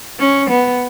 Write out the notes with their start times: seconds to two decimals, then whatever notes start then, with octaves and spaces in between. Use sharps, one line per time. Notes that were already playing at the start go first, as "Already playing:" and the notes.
0.19 C#4
0.50 B3